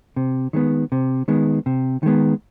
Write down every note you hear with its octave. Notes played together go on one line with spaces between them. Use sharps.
C3
D#3 G#3 B3
C3
D#3 G#3 B3
C3
D#3 G#3 B3